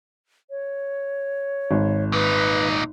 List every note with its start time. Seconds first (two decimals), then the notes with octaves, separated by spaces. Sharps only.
0.50 C#5
1.71 G#1
2.13 A#2 D#4 B4